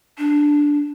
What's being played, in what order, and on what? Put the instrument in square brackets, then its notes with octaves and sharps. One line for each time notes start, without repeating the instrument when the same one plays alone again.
[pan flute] D4